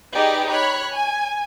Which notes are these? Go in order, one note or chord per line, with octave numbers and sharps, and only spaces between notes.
D#4 G4 G#4 B4 D5
C#5 B5 F#6
G#5